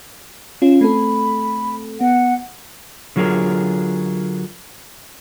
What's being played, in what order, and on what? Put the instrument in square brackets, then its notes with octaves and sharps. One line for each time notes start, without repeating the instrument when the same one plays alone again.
[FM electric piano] C#4 F4
[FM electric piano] A3 C4 A4 [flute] B5
[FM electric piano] B3 [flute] F#5
[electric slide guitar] D3 F#3 F4 G#4 A#4